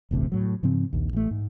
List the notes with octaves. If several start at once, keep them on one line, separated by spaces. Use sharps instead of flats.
E1 A1 D2 C3
A2 F#3
G#2 C#3 F3 C4
A#1 D#2
A1 A3
G#2